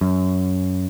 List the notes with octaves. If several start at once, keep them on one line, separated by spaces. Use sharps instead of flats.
F#2